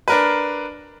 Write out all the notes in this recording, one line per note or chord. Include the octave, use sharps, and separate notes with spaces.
D4 A#4 B4